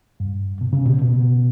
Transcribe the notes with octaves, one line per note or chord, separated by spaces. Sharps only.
G2
B2
C#3
B2
B2